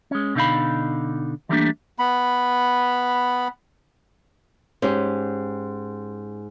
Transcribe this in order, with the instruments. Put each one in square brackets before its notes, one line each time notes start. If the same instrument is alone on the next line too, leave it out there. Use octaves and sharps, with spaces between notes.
[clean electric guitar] G#3 C#4
B2 D3 D#4 F5 B5
E3 G3 A3 A#3 C4 D4
[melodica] B3 B5
[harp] G#2 [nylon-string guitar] C#4 G4